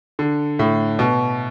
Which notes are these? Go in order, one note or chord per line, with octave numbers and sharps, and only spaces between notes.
D3
A2
B2